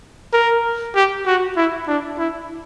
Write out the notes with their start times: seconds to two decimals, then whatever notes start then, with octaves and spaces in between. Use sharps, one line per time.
0.33 A#4
0.95 G4
1.26 F#4
1.56 E4
1.88 D4
2.18 E4